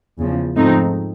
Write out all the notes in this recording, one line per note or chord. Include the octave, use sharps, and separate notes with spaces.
E2 C#3 F3
G#2 F3 A3 C4 D#4